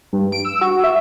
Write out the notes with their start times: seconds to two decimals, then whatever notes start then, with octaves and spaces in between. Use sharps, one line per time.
0.13 G2
0.32 D7
0.45 E6
0.61 F#4
0.84 E5